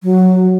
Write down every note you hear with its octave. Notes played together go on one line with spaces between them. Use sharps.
F#3